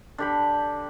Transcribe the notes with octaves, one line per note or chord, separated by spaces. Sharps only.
D3 G4 B5